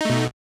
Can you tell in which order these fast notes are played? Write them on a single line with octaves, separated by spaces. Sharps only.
D#4 A3 B2